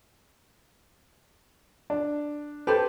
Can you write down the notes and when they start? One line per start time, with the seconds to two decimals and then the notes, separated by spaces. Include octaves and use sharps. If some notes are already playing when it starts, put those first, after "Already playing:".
1.90 D4
2.67 G4 A4 B4 C5